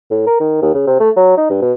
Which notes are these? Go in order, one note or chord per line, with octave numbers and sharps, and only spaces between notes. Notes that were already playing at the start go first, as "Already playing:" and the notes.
A2
A#4
D#3
D#2
C#3
C3
A3
F#3
D#4
G2
B2